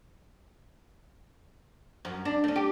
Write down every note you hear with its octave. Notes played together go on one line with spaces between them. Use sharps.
F#2
D4
A3 C#4
G4